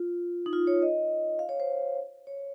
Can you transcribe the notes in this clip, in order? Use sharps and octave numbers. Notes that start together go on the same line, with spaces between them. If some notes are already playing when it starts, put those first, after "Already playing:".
Already playing: F4
D#4
F4
C#5
D#5
F5
C#5
C5
C#5